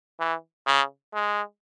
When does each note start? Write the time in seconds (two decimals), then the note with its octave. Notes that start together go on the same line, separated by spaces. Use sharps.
0.20 E3
0.67 C#3
1.14 G#3